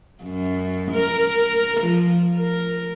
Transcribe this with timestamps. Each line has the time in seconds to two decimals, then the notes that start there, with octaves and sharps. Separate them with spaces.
0.23 F#2
0.92 A#4
1.81 F3
2.36 A#4